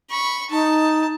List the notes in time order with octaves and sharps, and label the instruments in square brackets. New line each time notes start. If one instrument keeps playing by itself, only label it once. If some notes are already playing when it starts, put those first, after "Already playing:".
[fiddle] B5 C#6
[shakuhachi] D#4 [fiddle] A5